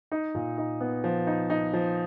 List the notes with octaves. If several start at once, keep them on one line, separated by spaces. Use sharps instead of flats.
D#4
A#2
D#4
B3
F3
D#4
D#4
F3